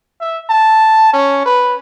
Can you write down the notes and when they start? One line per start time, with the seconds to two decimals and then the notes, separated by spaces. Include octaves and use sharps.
0.21 E5
0.50 A5
1.13 C#4
1.46 B4